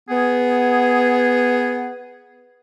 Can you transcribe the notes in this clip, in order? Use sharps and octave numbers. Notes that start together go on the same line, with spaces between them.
B3 G#4